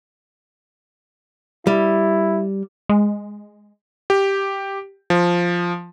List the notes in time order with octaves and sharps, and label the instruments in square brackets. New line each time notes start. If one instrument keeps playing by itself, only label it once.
[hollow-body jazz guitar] G3 [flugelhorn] E4
[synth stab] G#3
[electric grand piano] G4
F3